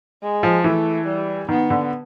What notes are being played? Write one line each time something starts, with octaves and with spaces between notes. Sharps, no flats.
G#3
F3
E3 A3
G3
D#3 B3
D3